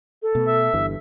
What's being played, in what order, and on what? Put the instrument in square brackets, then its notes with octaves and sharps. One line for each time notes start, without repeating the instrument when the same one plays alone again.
[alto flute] A4
[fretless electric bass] B2 A3
[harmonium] E5
[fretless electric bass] G1 G2 E3